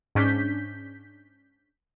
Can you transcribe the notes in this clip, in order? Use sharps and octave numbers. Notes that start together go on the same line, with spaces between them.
G#2 C#4 D4 G6 B6